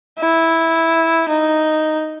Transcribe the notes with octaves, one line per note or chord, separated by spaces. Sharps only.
E4
D#4